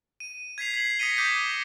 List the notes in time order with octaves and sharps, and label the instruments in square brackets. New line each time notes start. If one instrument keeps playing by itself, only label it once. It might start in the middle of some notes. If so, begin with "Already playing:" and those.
[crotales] D#7
G#6 B6 C7 F7
G#6 F#7
D#6 A#6 B6 C#7 D#7 G7
D6 D#6 G6 B6 D#7